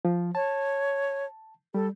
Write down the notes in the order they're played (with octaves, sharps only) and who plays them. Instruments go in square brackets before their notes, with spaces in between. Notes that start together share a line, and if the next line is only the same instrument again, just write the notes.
[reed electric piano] F3
[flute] C#5 [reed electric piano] A5
[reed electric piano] G3 [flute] A4